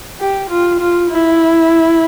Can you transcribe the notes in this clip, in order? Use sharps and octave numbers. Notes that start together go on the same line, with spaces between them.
G4
F4
F4
E4